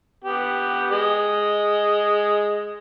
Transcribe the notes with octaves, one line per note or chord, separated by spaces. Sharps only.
B3 G4
G#3 D#5